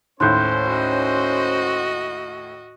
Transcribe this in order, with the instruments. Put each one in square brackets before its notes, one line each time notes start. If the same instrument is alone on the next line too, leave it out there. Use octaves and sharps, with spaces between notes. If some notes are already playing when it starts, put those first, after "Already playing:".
[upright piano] D#2 A2 [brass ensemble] C#4 C5 [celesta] C6 F#6 G6
[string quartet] F#4 D#5